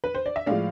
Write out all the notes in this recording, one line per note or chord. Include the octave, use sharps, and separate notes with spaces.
B4
C5
D5
E5
A2 F3 G#3 D5 F5